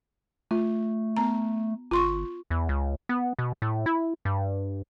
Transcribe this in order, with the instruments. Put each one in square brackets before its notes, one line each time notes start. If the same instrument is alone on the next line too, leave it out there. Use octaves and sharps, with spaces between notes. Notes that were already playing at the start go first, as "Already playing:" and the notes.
[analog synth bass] A3 [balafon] F4
[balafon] B3 A#5
[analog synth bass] G1 [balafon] F4 C6 C#6
[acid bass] E2
C#2
B3
B2
A2
E4
G2